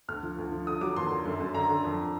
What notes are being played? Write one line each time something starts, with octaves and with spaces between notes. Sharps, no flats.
D2 F6
F3
D2
F3
D3 D#6
F#3 D6
D#2 C6
D3
F#2
F#2
D3 A#5
D3
F2